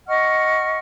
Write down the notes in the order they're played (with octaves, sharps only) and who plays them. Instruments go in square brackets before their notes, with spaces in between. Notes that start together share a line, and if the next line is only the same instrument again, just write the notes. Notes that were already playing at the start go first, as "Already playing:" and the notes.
[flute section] D#5 F#5 C#6 F6